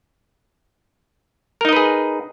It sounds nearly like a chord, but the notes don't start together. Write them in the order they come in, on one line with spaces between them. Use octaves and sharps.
A#4 D#4 D#5 B4 G#4